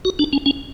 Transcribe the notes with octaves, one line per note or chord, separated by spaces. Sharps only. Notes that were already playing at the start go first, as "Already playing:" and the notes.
F#4
D4
C#4
C#4